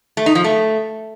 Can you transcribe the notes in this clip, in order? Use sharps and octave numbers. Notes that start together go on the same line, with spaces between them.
A3
D#4
F3
A3